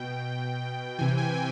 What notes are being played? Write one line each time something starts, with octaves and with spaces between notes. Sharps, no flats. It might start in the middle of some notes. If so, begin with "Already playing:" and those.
Already playing: B2 G5
C3 E3 G#5
G5
G#5
G5